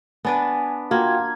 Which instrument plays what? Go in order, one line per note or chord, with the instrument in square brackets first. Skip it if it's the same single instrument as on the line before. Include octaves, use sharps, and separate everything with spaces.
[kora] B3 D4 B4 [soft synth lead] G#5
[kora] A#3 [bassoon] F4 [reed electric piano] F#4 G5 [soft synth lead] G#6